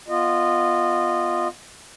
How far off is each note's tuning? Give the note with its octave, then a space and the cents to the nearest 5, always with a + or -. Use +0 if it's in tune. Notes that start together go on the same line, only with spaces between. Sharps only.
B3 +0 F4 +0 D#5 -20